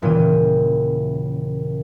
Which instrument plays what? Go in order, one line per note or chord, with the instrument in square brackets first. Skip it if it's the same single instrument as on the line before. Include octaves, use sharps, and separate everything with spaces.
[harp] D#1 A#2 C#3 E3 G5 D#7